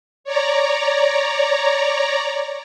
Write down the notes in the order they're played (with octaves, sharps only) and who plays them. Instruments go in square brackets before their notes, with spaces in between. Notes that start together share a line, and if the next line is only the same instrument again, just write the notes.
[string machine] C#5 D5 A#5